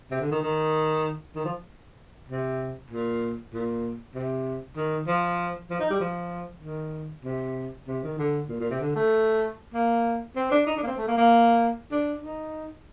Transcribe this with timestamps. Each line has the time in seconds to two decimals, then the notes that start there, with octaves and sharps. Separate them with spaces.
0.11 C3
0.21 D3
0.31 D#3
0.43 D#3
1.35 D#3
1.45 F3
2.28 C3
2.90 A#2
3.53 A#2
4.14 C3
4.76 D#3
5.07 F3
5.70 F3
5.80 D#4
5.90 G3
6.00 F3
6.63 D#3
7.24 C3
7.88 C3
8.03 D#3
8.18 D3
8.49 A#2
8.60 A#2
8.70 C3
8.80 D3
8.95 A3
9.73 A#3
10.36 C4
10.51 D4
10.66 D#4
10.77 D4
10.83 A#3
10.87 C4
10.97 A3
11.07 A#3
11.18 A#3
11.91 D4
12.22 D#4